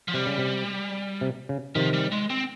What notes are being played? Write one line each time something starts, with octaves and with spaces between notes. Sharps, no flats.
F3
C3 G3
C#3
C3
C3
C#3
C3 D#3 F3
G3
G#3
C4